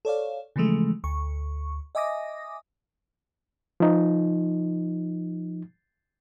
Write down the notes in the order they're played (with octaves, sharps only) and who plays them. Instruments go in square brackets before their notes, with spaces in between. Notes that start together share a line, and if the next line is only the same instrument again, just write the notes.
[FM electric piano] A4 C#5 D5 F5
C#3 E3 F3 G#3 A3
D2 C#6
D#5 E5 G#5 D6 D#6 A#6
[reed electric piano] F3 D#4